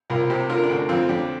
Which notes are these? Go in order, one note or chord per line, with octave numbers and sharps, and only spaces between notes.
C2 F4 A#4
C3 G4 C5
D3 F4 A#4
D4
D2
D4
F2 C4 F4
F2 D4 G4